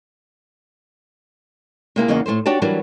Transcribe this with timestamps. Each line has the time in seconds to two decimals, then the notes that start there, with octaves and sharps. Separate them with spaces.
1.96 C3 A#3 E4 G#4
2.08 E2 C#3 A#3 D#4 D#5 F#5
2.26 A2 A3 A4 C5
2.46 D4 F#4 G4 C#5 A5
2.62 E3 F#3 G3 D4 F#4 A#4